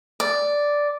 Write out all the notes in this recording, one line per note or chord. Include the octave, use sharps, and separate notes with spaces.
D5